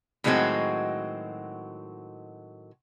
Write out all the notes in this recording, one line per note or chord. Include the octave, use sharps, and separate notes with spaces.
A2 D#3 F#3 G#3 C4 F#4